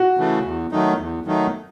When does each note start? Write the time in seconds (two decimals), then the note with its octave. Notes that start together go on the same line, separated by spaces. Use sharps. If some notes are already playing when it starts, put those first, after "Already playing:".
Already playing: F#4
0.18 C#3 E3 A3
0.45 E2
0.72 D#3 F#3 A3 D#4
0.98 E2
1.25 D#3 F#3 A3 D#4